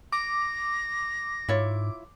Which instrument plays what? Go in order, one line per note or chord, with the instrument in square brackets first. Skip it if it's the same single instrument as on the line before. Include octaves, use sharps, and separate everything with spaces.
[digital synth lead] D6 [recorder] A#6
[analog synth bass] G#2 [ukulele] E4 F4 C#5